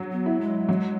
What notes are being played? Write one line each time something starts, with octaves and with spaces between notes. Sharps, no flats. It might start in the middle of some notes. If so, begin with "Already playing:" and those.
Already playing: F#3
B3
E4
G#3
F#3